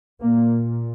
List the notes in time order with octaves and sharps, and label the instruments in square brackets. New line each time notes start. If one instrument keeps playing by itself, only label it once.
[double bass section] A#2 A#3